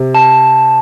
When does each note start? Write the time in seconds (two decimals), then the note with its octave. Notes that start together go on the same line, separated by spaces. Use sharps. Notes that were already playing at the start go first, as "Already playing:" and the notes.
Already playing: C3
0.15 A5